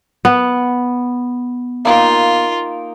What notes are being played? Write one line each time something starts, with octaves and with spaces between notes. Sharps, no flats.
B3
A#3 D#4 F4 G5